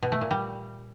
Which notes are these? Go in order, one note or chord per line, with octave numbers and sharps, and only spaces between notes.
B2
A3
A#2
G3